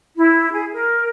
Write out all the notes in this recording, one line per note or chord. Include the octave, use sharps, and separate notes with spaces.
E4
G#4
A#4